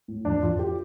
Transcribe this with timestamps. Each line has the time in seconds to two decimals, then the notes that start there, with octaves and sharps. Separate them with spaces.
0.08 A2
0.25 F2 D4
0.43 F2 F4
0.59 G4